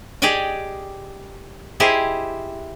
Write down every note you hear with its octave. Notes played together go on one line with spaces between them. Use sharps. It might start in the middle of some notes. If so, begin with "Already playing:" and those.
G4 G#4 D5 D#5 G5 G#5
E4 G4 G#4 C5 D#5 E5